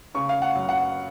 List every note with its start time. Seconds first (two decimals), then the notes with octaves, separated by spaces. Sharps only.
0.14 C#3 C#6
0.29 F5
0.42 F#5
0.55 F#2
0.69 F#5